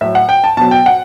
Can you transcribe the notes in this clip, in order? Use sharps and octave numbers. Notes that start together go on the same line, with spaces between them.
A2 F#3 E5
F#5
G5
A5
B2 F#3 A5
G5
F#5